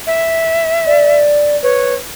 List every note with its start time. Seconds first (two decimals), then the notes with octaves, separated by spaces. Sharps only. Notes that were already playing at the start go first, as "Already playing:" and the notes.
0.07 E5
0.86 D5
1.63 B4 C#5